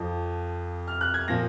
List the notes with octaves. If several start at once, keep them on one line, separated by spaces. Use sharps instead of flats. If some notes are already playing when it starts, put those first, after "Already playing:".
Already playing: F2 F3
F6
F#6
G#6
A#2 F3 A#6